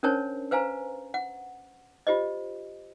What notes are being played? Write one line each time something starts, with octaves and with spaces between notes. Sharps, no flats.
C#4 D4 A#4 C5 C#5 A5
B4 C5 F5 G#5 A#5
F#5
F4 G4 C5 D#5